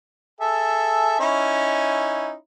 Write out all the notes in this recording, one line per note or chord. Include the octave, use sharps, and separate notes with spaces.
G#4 A4 E5
C#4 D#4 E4